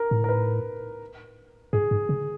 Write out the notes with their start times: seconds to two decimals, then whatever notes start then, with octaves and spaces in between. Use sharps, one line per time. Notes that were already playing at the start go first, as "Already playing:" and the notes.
Already playing: A#4
0.11 A2
0.24 A#4
0.29 B4
1.73 G#2 G#4
1.91 G#2
2.09 C#3